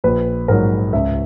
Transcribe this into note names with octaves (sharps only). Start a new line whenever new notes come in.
A#1 B4
G#2 F#3 A#4
C#2 E5